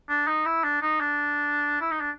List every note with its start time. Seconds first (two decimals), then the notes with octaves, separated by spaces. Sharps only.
0.09 D4
0.27 D#4
0.45 E4
0.64 D4
0.82 D#4
1.00 D4
1.81 E4
1.91 D#4
2.01 D4